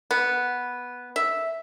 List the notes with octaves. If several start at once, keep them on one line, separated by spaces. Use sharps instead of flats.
B3
E5